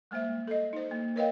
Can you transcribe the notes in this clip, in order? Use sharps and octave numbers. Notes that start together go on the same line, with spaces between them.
G3 G#3 A#3 C5 E5
A4 D#5
D#4 C5
A#3
A#4 B4 C#5 D#5 F5 G5